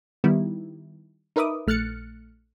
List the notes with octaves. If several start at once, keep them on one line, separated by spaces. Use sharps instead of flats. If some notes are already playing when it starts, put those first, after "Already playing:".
D#3 G3 B3 E4
D#4 A#4 B4 E5 D6 D#6
A#1 A3 F6 F#6 A6 C#7